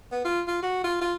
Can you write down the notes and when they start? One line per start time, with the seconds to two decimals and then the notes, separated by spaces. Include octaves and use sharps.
0.12 B3
0.25 F4
0.47 F4
0.62 F#4
0.84 F4
1.01 F4